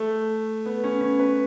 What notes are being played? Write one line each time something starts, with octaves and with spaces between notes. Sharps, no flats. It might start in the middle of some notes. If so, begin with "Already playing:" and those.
Already playing: A3
B3
C#4
C#4
B4